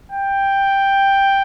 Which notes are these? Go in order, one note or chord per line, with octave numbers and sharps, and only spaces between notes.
G5